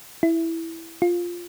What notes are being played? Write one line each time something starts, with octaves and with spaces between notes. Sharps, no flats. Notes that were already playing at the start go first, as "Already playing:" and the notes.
E4
F4